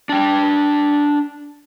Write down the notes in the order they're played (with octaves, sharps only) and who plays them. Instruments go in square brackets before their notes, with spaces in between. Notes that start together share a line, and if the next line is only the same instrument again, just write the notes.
[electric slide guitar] D4 G5